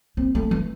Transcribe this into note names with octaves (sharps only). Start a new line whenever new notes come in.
C4
A3
E3